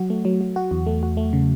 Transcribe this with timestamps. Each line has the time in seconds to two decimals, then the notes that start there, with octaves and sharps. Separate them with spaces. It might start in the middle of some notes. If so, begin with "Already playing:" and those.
Already playing: F#3 F#4
0.10 A3
0.25 F#3
0.40 F#3
0.56 F#4
0.71 E2
0.86 A3
1.03 F#4
1.17 A3
1.33 C#3